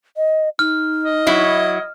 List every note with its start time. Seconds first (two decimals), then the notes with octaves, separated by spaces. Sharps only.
0.17 D#5
0.59 D#4 F6
1.03 D#5
1.27 F#3 E4